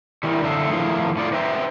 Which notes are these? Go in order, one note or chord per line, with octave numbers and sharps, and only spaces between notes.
D#3 E3 G3
F#2 D3 D#4 A4 E5 F5
D#3 F3 A3 E4 G#4 F5
A2 D#4 F4 D5
B4 C5 D#5 E5 G5